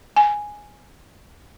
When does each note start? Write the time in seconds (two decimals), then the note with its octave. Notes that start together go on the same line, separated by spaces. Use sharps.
0.16 G#5